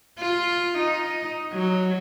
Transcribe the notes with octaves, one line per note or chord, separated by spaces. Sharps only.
F4
D#4
F#3